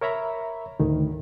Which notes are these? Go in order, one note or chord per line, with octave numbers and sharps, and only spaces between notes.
A#4 C#5 E5 A#5 B5
D2 A2 D#3